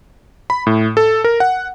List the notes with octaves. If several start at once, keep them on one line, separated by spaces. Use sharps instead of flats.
B5
A2
A4
A#4
F#5